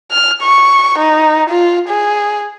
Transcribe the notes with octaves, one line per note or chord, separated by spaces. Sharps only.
F6
C#6
D#4
F4
G#4